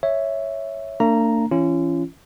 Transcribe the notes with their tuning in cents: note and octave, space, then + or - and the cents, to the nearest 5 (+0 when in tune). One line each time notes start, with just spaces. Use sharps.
C#5 +0 E5 +0
A#3 -45 D4 +0 A#5 +0
E3 +0 C#4 +0 F4 -40